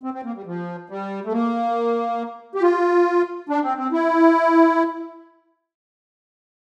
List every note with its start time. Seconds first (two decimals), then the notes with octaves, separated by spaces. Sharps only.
0.03 C4
0.14 C4
0.24 A#3
0.35 G3
0.46 F3
0.90 G3
1.25 A3
1.32 A#3
2.55 G4
2.62 F4
3.49 D4
3.63 C4
3.77 C4
3.92 E4